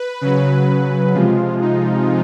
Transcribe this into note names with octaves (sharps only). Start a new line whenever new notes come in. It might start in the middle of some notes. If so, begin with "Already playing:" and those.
Already playing: B4
C#3 F#3
C3 F3 G#3 F4
D#4